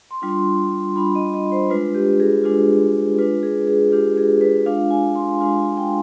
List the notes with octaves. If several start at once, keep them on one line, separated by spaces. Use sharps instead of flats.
C6
G3 D4 F4
C6
G3 D4 F4 B5
D#5
D#5
C5
G#3 D4 F4 B4
G4
G#4
G#3 D4 F4
G#3 D4 F4 B4
G#4
G#4
G#3 D4 F4 G4
G#4
B4
G#3 D4 F4 F5
G#5
C6
G#3 D4 F4 G#5
G#5
G5